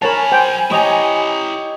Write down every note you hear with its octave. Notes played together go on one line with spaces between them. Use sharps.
F#3 A#4 C#5 G#5 A5 B5
C5 G5
E4 G4 C#5 D#5 A#5